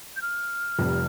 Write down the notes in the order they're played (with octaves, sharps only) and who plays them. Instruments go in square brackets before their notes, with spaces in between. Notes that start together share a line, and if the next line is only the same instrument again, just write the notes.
[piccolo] G6
F6
[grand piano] F1 F2 C3 G3